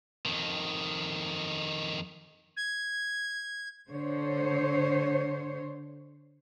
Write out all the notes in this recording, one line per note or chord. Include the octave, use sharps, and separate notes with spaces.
F2 D#3
G#6
D3 C5 C#5